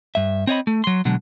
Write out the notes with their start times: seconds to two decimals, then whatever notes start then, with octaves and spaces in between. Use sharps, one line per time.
0.15 G2 E5
0.47 C4 C#5 D#5 B5
0.67 A3
0.84 F#3 C6
1.05 B2 D3 F#3 G#3